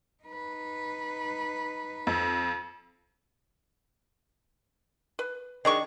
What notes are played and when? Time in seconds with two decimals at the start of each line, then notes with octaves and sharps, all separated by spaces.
0.24 D#4 B4
2.07 F2
5.19 B4
5.65 D#3 G#3 D4 C#6